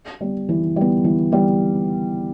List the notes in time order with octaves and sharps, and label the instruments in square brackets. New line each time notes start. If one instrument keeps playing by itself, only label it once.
[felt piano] G3 B3
E3
G3 B3
E3
G3 B3